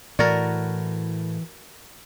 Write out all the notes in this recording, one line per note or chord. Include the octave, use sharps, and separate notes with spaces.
A2 E3 F#4 A#4 D5 A6